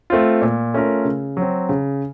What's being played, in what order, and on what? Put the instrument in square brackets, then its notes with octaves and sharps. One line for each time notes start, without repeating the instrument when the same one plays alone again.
[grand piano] A3 C4 F4
A#2
A3 C#4 F4 A#4
C#3
F#3
C4
C#3